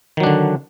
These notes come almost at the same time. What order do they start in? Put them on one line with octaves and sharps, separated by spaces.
D#3 F#3 D4 D3